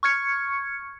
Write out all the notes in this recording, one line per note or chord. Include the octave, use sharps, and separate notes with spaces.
C#6 F6 G#6 C#7